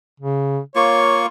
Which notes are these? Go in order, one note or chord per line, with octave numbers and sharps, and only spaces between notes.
C#3
A#3 F4 C#5 C#6